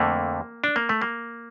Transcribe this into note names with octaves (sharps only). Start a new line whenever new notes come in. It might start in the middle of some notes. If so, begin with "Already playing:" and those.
Already playing: F2 D3 A3 A#3
D4
A#3
A3
A#3